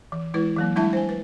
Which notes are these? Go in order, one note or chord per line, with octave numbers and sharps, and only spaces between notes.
E3
E3 G#3 E4 B4
E3 F#3 A#3
G3 G#3 D4 E4 E5 A5
C5 G#5
B4